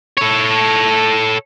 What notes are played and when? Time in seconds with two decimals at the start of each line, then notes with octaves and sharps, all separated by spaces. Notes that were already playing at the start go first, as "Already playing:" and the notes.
0.17 A4 C#5